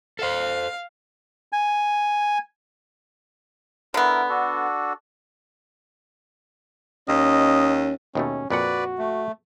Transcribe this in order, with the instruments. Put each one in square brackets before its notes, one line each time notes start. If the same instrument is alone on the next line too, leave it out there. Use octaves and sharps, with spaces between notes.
[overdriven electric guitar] A4 C5 [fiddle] F5
[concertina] G#5
[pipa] D3 B3 [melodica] E4 A#4
[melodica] D4 F#4 A4
[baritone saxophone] D#2 [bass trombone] C#4 [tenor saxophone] D#5
[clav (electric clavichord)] D#2 B2 A3 [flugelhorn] C#4
[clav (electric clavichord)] F2 A#2 F#5 [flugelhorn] F#4 [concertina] B4 D5
[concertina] A3